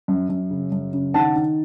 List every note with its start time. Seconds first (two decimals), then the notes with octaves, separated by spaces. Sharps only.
0.08 F#2
0.29 F#2
0.50 C#3
0.72 F#2
0.93 C#3
1.14 D#3 F#5 A5
1.35 D#3